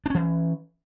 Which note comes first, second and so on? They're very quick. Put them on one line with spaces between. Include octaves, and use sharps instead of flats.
D4 C#4 E3